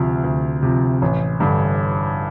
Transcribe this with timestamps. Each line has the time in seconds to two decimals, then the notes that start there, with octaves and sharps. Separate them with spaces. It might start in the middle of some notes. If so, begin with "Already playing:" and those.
Already playing: D2 C3 F3
0.24 D2
0.63 C3 F3
1.02 A1
1.40 G2 D3